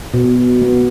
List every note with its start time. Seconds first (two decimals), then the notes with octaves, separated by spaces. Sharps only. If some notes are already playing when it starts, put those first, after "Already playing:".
0.14 B2
0.62 B3